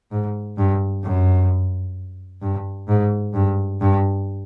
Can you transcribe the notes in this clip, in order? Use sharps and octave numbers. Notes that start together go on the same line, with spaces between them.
G#2
G2
F#2
G2
G#2
G2
G2